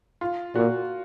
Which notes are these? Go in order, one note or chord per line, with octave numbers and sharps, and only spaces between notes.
F4
A#2 F#4